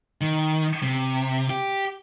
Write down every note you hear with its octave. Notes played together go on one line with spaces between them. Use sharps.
D#3
C3
G4